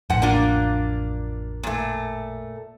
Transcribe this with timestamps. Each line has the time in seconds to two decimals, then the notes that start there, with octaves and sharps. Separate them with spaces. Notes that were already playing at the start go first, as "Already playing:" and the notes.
0.10 A1 F2 G#2 F#5
0.22 A#3 D4 F4
1.63 A#2 A3